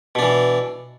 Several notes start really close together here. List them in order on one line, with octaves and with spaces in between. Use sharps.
B2 D4 E3